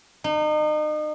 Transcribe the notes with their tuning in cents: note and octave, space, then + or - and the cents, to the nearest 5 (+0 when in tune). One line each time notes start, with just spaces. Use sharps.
D#4 -35